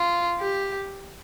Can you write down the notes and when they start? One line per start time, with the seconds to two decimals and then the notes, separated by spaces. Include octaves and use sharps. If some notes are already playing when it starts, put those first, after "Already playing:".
Already playing: F4
0.40 G4